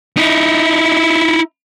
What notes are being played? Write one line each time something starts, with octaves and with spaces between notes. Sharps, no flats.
D#4 E4